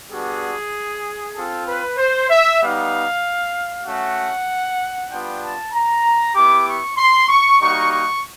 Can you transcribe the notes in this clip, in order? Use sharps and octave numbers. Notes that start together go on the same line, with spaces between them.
G3 B3 D4 F#4 G#4
C4 F4 A4
B4
C5
E5
G3 B3 D#4 F5
A3 C#4 F#4 F#5
G3 B3 D4 F4 G5
A5
A#5
B3 E4 G4 D6
C#6
C6
C#6
G3 A#3 D#4 F#4 C#6
C#6